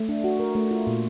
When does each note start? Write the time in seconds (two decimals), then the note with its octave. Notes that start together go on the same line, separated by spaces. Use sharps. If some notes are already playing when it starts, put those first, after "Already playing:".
Already playing: A3
0.09 D4
0.24 F#4
0.40 A#4
0.55 A3
0.71 F4
0.87 A#2